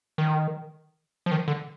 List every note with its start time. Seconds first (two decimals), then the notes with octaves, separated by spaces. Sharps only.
0.18 D#3
1.26 F3
1.32 D#3
1.48 D3